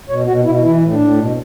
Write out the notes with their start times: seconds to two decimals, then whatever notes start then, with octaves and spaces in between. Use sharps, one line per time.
0.09 B2 C#5
0.27 B2 F#4
0.45 B2 E4
0.63 E3 E4
0.82 A2
0.92 D4
0.99 A2
1.18 B2